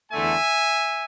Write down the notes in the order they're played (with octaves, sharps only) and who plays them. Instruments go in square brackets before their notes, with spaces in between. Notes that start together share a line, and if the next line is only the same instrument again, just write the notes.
[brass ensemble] E2 D3 A3 E5 G#5